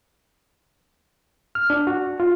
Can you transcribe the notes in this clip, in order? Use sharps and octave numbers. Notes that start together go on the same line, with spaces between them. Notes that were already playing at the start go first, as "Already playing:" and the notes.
F6
D4
F#4
F4